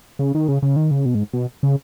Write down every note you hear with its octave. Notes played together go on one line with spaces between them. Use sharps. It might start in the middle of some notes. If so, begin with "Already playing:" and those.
C#3
D#3
C#3
C#3
D#3
C#3
B2
G#2
B2
C#3